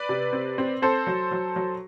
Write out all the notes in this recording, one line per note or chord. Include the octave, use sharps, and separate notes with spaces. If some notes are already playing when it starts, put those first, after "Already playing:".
Already playing: B4 D5
C3
C4
C4
C4 A4 C5
F#3
F#3
F#3